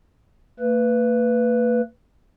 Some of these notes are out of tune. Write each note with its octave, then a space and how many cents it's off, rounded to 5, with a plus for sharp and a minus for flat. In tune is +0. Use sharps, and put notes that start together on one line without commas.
A#3 -45 B4 +0